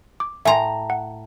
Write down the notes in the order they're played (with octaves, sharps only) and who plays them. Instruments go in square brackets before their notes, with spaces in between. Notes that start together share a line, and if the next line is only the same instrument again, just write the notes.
[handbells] D6
[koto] A2 A#5 [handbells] E5 G#5 C6
[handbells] F#5